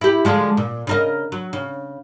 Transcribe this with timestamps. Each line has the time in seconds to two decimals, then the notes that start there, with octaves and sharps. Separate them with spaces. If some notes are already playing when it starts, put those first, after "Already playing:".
0.01 E4 G4
0.25 D3 F3 G#3
0.57 A#2
0.87 C#3 A#4 D#5
1.32 F#3
1.53 C#3